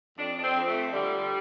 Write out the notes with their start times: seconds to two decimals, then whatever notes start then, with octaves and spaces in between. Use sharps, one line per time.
0.17 F2 D4
0.38 D4
0.42 C4
0.55 F2
0.67 A3
0.93 D3 G3